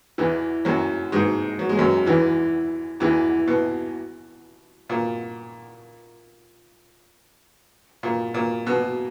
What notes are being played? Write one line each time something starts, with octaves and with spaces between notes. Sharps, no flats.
E2 E3
F#2 F#3
G#2 G#3
F#3
G#3
F#2 F#3
E2 E3
E2 E3
B2
A#2
A#2
A#2
B2